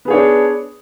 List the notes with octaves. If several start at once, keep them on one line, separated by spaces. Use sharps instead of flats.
B3 D4 G#4 C#5